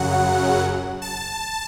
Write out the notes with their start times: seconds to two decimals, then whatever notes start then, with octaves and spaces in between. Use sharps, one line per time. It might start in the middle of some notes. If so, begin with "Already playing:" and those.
Already playing: F#2 C#3 F#3 F#5
1.02 A5